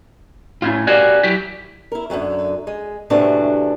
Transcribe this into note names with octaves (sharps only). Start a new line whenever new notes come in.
A2 C#4 E4 F4
F#4 G4 A#4 D5 F5 G#5
F#3 E4 G4
E4 A#4
F#2 D3 E3 F#3
G#3
D#2 A2 C3 E3 D4 F#4